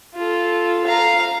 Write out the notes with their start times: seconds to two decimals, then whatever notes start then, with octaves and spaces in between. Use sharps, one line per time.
0.16 F4 A4
0.85 F5 A#5